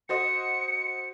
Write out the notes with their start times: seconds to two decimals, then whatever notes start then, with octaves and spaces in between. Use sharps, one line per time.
0.09 F#4 C5 D#5 C#7